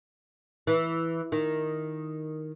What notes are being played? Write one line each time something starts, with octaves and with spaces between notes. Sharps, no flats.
E3
D#3